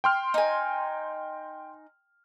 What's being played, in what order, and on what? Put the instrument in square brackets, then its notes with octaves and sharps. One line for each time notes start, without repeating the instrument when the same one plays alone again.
[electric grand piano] G5 C6 F6
[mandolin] D#4 G#5